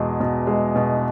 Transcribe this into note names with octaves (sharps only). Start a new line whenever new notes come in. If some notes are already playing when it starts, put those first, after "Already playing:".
Already playing: E2 B2 G#3
B2
G#3
B2